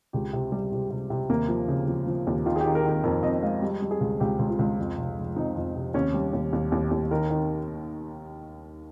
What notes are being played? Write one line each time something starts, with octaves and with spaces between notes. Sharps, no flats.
C#2 G4
C3
G3
C3
C3
C3
D#2 A#3
F3
C#3
F3
F3
D#2
D#3 F4
G#4
G4
D#3
A#4
D#3 A#4
F2 A#4
F2 D#5
G#3 F5
G3
G3
G#4
C#2
C#2 G4
C#2
F4
C#2
F2
F1
F1
F2 D#4
F2
C3
D#2 C#4
G3
D#2
D#2
D#2
D#2
D#3 A#4
D#3